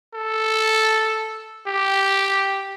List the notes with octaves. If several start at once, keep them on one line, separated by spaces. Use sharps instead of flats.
A4
G4